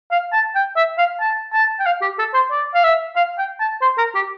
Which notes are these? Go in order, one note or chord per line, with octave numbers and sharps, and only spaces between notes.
F5
A5
G5
E5
F5
A5
A5
G5
F5
G4
A4
C5
D5
F5
E5
F5
G5
A5
C5
A#4
G4